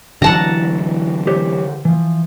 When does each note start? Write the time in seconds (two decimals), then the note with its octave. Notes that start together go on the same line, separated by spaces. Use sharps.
0.22 D3 E3 F#3 F#5 A5 A#5
1.27 G4 C5 C#5
1.85 E3 F3